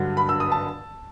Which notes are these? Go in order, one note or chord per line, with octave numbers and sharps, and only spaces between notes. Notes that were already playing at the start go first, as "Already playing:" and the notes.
Already playing: G2 D3 F#3
B5
E6
D#6
A5